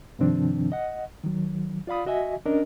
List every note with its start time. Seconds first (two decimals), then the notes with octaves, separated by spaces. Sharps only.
0.19 G2 C3 D#3 F3 C4 D4
0.72 D#5 F#5
1.24 D#3 F#3
1.87 F4 D5 F5 B5 D#6
2.06 F#4 D#5 E5 G#5
2.46 C#4 D4 A#4 D#5